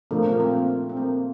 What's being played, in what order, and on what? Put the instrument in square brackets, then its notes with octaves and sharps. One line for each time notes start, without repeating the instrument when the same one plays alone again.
[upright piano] A#2 F3 A3 D4 [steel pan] A#3
[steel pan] A#3
C4
C4
A#3